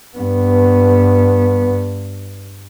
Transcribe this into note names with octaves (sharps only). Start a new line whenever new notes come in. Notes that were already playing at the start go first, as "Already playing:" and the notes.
G2 B3